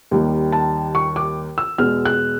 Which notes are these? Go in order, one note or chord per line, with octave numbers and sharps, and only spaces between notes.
D#2 D#3 G3
A5
C#6
D6
E6
E2 B2 G#3 F6
F#6